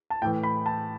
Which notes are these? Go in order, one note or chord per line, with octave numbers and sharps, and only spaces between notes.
A5
A2 E3 G5
B5
A5